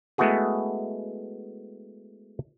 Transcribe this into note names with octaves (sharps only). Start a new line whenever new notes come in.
G#3 A3 B3 E4 F#4 G#4